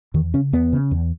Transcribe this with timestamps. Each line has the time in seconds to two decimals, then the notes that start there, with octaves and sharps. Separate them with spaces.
0.14 E2 D#3
0.34 C#3 C#4
0.53 E2 B3
0.72 C#3
0.91 E2